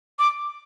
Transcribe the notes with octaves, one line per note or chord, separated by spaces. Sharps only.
D6